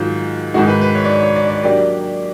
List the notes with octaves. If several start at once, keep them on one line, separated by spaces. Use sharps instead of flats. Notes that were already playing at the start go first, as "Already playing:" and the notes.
Already playing: G#2 D#3 F#3 F4
G#2 D#3 G#3 F#4
B4
B4
C#5
D5
C#5
C#5
D5
D5
F#3 A#3 D4 G4 D5